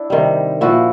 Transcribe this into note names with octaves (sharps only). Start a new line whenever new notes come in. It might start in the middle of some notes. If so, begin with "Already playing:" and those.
Already playing: D4 E4
C3 D#3 G3
A#2 F3 E4 F#4